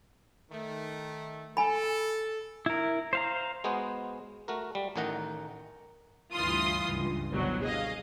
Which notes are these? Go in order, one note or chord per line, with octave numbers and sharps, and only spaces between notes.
D#3 A3
A4 G#5 B5
E4 A#4
C5 F5 A#5
G#3 B3 F#4 G#4 C5
A3 F#4 A#4
G3
A1 A2 D#3 D#4 F#5 A#5
D2 G2 E3 F4 C6 D#6
C#2 G2
G1 C2 B2 F#3
G#4 D#5 F5